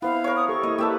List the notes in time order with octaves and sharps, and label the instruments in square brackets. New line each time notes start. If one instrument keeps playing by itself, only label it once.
[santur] B3 [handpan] E4 C5 [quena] F5
[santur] A#4 C#5
[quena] D#6
[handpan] G4 A4 [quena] C#6
[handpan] A#3 E4 [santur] D#5
[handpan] A#3 B4 [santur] G4 E5 A5